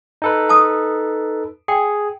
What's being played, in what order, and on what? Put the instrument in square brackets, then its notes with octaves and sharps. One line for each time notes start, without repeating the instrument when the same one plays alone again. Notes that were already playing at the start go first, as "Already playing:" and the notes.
[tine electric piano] D#4 A4 B4
[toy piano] A5 D#6
[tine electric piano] G#4 [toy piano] G5